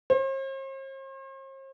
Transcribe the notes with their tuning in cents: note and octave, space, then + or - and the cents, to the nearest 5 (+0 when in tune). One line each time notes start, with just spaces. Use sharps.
C5 +45